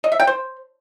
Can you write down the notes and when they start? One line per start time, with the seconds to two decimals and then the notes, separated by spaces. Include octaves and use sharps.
0.04 D#5
0.12 E5
0.20 G5
0.27 C5